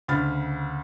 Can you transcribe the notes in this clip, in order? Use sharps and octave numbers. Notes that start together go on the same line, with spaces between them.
D2 C#3 B5 F6 A6